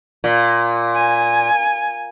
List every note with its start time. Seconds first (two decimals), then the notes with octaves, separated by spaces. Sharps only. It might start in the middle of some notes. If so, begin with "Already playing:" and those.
0.24 A#2
0.95 G#5